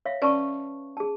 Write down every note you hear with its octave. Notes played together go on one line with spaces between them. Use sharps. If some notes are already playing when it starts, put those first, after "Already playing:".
C#5 E5 F5
C#4 B4 D5 A5 C#6
G#4 A5